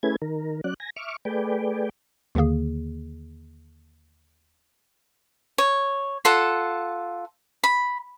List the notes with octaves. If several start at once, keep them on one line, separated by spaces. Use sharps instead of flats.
A3 C#4 E4 G#4 B4 G#6
D#3 A#4
F#3 C#4 D5 F#6
G#5 A#6
E5 C#6 D6 F6
A3 G#4 B4 D5 G5
D#2 D3 D#3 A#3 G#4
C#5
F4 A4 F#5
B5